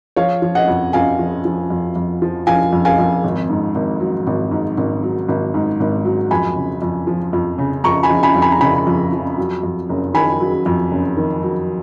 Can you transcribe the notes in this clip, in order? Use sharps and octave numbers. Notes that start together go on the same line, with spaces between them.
F3 C#5 F5
F3
D#5 F#5
F2
F2 F5 G#5
F3
F3
F2
F2
F3
F3 F5 G#5
F2
F5 G#5
F2
G#1
G#2
G#1
F#3
G#1
G#2
G#1
F#3
G#1
G#2
G#1
F#3
F2 G#5 B5
C#3
F2
F3
F2
C#3
F2 A#5 C#6
G#5 B5
F3
G#5 B5
F2
G#5 B5
A#5
C#3 G#5 B5
F2
F3
F#3
F2
F#1
D#3 G#5 B5
F#3
F2
F#1
D#3
F#3